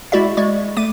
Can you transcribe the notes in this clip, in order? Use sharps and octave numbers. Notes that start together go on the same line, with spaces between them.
G#3 E4 F#4 D5 E5
G#3 D5 D#5 C#6
A3 D6 D#7